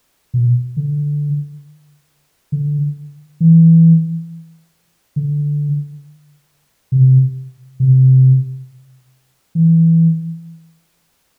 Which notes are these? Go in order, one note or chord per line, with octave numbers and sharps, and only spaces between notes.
B2
D3
D3
E3
D3
C3
C3
E3